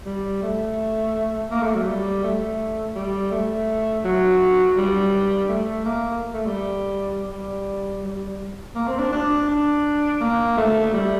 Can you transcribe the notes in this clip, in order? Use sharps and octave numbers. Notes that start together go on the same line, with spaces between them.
G3
A3
A#3
A3
F#3
G3
A3
G3
A3
F#3
G3
A3
A#3
A3
G3
G3
G3
A#3
C4
D4
D4
D4
A#3
A3
G3